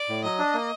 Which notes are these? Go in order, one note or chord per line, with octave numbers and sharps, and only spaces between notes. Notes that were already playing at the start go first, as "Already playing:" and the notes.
Already playing: D5
A2
F#3 D#5
D4
A#3